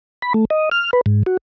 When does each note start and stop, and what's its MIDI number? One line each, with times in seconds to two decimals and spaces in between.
0.22 0.33 83
0.34 0.45 57
0.50 0.69 75
0.72 0.91 89
0.93 1.01 71
1.06 1.23 44
1.26 1.37 66